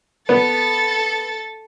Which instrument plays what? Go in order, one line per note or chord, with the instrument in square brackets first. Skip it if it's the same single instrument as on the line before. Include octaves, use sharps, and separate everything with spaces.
[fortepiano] B3 [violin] A4 A6